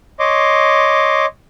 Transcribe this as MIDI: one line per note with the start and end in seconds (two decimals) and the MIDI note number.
0.19 1.26 73
0.19 1.26 75
0.19 1.26 84
0.19 1.26 86